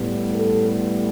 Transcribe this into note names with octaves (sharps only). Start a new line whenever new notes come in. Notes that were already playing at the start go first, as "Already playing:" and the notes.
Already playing: A2 G3 B3
A4